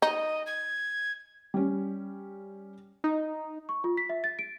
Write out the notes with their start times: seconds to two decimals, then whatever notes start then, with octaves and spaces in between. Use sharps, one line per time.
0.02 D#4 D#5
0.46 G#6
1.54 G3 C#4
3.04 D#4
3.69 C#6
3.84 F4
3.97 B6
4.09 E5
4.24 A6
4.39 D7